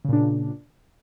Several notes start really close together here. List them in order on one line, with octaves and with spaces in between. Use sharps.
C#3 A#2 D4